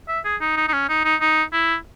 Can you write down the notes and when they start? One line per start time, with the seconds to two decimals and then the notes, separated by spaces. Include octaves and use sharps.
0.08 E5
0.25 G#4
0.41 D#4
0.57 D#4
0.68 D#4
0.73 C#4
0.89 D#4
1.05 D#4
1.21 D#4
1.53 E4